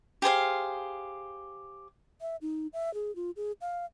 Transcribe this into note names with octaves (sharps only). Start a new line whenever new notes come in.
G4 G#4 C5 F5
E5
D#4
E5
G#4
F4
G#4
F5